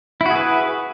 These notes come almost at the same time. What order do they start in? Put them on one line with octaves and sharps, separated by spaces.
E4 F#4 G#4 B4